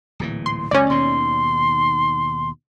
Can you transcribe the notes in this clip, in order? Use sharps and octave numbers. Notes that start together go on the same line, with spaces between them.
D1 A#2 E3
C6
C#2 F#2 C#4 D5
D#2 B2 D#3 C6